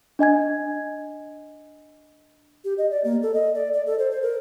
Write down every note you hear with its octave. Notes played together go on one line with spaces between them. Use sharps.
D4 D#5 G#5 G#6
G4
D#5
D5
A#3
A4
D#5
D5
D5
A4
C5
C5
A#4